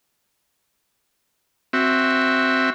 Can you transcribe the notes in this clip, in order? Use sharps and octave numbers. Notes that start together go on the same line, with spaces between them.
C4 F#4 E5